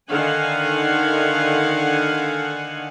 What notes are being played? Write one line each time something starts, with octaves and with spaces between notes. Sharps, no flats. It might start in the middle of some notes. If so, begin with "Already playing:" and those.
D3 D#3 F5 F#5 G#5